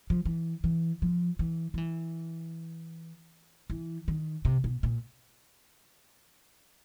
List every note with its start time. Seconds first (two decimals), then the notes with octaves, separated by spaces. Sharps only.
0.10 F3
0.25 E3
0.64 E3
1.02 F3
1.39 E3
1.74 F3
1.78 E3
3.70 E3
4.08 D#3
4.45 C3
4.64 B2
4.83 A#2